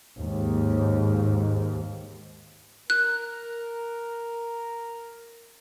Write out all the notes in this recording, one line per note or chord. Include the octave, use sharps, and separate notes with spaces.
D#2 G#2
A#4 F#6